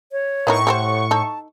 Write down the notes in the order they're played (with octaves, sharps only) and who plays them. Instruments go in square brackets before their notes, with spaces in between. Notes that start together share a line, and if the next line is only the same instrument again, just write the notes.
[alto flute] C#5
[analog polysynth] A2 C#6 [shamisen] B3 D#4 A#4
[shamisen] G4 A4 C5 [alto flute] F#5
[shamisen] D#4 A4 [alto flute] A5